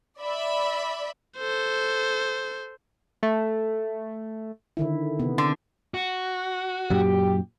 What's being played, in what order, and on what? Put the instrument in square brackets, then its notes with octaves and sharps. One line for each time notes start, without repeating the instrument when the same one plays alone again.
[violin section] D5 E5 B5
[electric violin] A4 C5
[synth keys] A3
[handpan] D3 D#3 E4
C3 B3
[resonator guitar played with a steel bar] D3
[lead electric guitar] F#4
[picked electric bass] F#2 A#2 F#3 [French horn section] G4